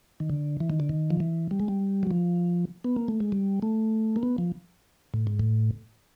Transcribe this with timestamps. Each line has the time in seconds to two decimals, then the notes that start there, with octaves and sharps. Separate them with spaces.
0.20 D#3
0.30 D3
0.60 E3
0.70 D#3
0.80 D3
0.89 D#3
1.10 F3
1.20 E3
1.51 G3
1.60 G#3
1.68 G3
2.03 F#3
2.11 F3
2.84 B3
2.96 A#3
3.08 A3
3.20 G#3
3.32 G3
3.62 A3
4.16 A#3
4.23 B3
4.38 F3
5.14 A2
5.27 G#2
5.40 A2